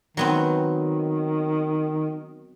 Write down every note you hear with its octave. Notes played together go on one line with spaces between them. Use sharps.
D#3 F#3 B3 C4